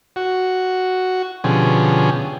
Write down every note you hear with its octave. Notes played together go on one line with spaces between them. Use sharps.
F#4
B2 D3 F3 C#4 G4 G#4